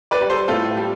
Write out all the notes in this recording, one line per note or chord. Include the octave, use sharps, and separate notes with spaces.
B4 D5
G3
A4 C5
A2 F4 A4
G3